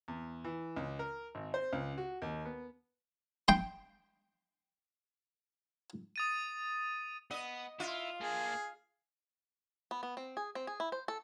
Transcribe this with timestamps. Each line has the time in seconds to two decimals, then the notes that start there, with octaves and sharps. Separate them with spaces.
0.08 E2
0.45 E3
0.76 C#2
0.99 A#4
1.35 G#1
1.54 C5
1.73 C#2
1.98 F#4
2.22 D#2
2.45 B3
3.48 G5 C6
6.16 D#6 A6 D#7
7.31 B3 D#5
7.80 E4 F4
8.21 A#3 D4 G#4
9.91 B3
10.03 B3
10.17 C4
10.37 G#4
10.55 C4
10.67 G#4
10.80 E4
10.92 C5
11.08 A4